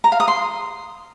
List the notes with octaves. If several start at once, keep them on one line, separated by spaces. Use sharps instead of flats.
A#5
F5
D#6
C6